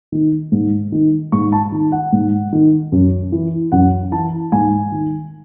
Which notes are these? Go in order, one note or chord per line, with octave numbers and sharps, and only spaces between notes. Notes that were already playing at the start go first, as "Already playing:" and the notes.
D#3
G#2
D#3
G#2 C#6
A5
D#3
F#5
G#2
D#3
F#2
E3
F#2 F#5
E3 A5
G#2 G#5
D#3